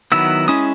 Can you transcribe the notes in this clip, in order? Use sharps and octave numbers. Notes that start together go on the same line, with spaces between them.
D#3 F#3 B3 E4 E6
G#3 C#4 E4 D#6